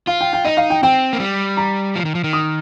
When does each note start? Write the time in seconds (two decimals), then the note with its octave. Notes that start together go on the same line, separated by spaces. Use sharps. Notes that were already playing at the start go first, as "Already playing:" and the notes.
0.07 F4 F5
0.21 G5
0.33 G5
0.45 D#4 D#5
0.57 F5
0.70 G5
0.83 C4 G5
1.13 A#3
1.20 G3
1.57 A#5
1.95 F3
2.05 D#3
2.15 F3
2.24 D#3
2.33 D#6